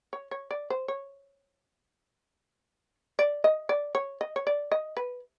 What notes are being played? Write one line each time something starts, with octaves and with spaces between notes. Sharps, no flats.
C#5
C#5
D5
C5
C#5
D5
D#5
D5
C#5
D#5
C#5
D5
D#5
B4